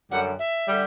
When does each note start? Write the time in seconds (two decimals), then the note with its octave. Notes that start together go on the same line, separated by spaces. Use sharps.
0.11 F#2 D3 G3 F#5
0.39 E5
0.67 D3 G3